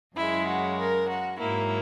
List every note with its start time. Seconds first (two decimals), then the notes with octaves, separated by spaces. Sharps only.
0.16 F#2 C#3 G#3 E4
0.47 F#4
0.78 A#4
1.08 F#4
1.38 G#2 F#3 A#3 E4